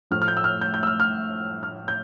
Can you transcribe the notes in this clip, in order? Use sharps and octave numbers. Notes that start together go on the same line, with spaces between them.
A2 F3 A3 F6
F6
G6
E6
F6
G6
G6
E6
F6
F6
F6
G6